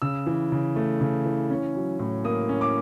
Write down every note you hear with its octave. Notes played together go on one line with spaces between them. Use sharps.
C#3 E6
E3
C#3
A3
C#3
E3
C#4
F#3
A2
A#3 D#6
C#4
D6